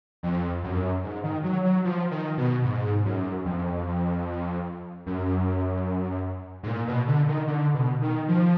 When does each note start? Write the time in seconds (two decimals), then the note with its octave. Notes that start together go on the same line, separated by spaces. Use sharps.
0.23 F2
0.64 F#2
1.04 G#2
1.23 D#3
1.44 F#3
1.64 F#3
1.85 F3
2.11 D#3
2.37 B2
2.64 G#2
3.05 F#2
3.45 F2
5.06 F#2
6.63 G#2
6.67 A#2
6.87 B2
7.07 D3
7.28 D#3
7.47 D3
7.74 B2
8.02 D#3
8.28 F3